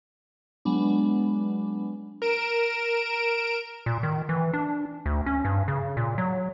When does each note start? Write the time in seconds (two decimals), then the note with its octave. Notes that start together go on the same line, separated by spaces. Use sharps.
0.65 F#3 G#3 B3 D4
2.22 A#4 D7 E7
3.86 A#2
4.03 D#3
4.29 E3
4.53 D4
5.06 D2
5.26 C#4
5.45 G2
5.68 C#3
5.97 A#2
6.18 F#3